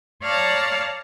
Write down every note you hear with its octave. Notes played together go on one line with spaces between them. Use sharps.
C#5 D5 F5 A5 A#5